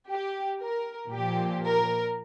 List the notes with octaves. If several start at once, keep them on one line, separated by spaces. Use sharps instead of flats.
G4
A#4
A#2 F3 G4
A#4